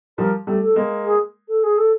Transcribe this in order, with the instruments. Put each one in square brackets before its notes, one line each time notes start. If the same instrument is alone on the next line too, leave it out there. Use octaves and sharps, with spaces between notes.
[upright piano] F3 G3 [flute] A#4
[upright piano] G3 A3
[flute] A4
[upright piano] G#3 A#3
[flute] G#4
A4
G#4
A4